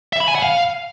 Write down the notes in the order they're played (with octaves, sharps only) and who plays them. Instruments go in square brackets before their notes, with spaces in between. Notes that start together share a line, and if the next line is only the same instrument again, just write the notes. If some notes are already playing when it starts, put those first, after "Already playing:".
[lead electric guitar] E5
B5
G#5
F#5
F5